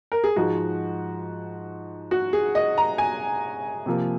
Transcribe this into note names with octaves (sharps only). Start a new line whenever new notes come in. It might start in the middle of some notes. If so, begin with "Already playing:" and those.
A#4
G#4
G#2 F3 G#3 F#4
F#4
G#4
D#5
A#5
G#5
C3 F3 A#3